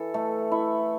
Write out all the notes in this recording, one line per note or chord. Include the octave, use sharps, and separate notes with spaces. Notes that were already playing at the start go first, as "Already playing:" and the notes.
Already playing: E3 A4
A3
E4